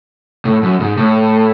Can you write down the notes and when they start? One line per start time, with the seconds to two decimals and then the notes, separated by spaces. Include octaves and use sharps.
0.45 A2
0.63 F#2
0.80 G#2
0.97 A2